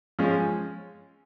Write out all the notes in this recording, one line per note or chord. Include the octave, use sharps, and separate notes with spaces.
F3 G#3 C#4